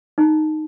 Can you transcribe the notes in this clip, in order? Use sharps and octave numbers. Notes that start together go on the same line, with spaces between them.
D#4